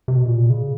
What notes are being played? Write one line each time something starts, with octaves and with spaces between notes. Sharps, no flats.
C3
B2
A#2
C#3